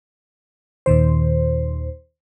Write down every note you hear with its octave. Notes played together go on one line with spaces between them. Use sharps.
D#2 A#2 D#3 C5